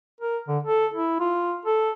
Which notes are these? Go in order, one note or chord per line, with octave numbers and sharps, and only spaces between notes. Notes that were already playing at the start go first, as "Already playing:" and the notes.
A#4
D3
A4
E4
F4
A4